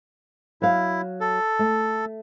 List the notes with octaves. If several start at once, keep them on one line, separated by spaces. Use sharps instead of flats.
F#3 E4 F5
A4
A3